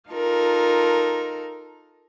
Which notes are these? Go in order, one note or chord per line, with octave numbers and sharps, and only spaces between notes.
D#4 F4 A4 A#4